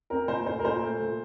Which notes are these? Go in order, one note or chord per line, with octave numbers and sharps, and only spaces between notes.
C4 A#4
A#2 C5
A3 C5
A#4
A#2 C5
A3
A#2